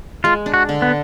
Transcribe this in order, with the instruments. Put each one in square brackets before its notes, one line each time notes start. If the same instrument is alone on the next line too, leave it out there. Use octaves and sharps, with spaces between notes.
[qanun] G#3 [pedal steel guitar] F4
[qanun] D4
[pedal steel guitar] F#4
[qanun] D3
[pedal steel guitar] B3